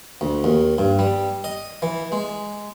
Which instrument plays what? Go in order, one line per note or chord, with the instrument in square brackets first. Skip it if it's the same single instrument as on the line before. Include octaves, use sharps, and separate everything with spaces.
[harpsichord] D2
D#2
G2
G3
D#5
E3
G#3